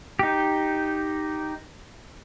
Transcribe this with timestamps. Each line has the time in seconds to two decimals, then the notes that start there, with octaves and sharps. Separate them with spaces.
0.19 D#4 G4